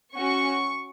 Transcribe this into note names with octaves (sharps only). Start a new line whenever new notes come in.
C#4 F#4 C#6